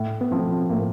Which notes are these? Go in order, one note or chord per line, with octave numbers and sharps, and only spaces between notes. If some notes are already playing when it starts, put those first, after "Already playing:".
Already playing: A2
B3
F3 A3 C4
A2 A#3